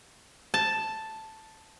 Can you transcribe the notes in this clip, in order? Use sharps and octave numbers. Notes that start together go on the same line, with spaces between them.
A5